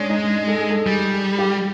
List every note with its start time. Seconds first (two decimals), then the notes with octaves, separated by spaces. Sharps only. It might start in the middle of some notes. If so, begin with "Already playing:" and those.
Already playing: G#3 C#4 D4
0.10 D#4
0.47 A4
0.58 G#4
0.70 A4
0.87 G3 G#4
1.13 G#4
1.39 G4